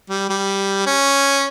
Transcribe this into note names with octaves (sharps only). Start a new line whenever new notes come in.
G3
G3
C#4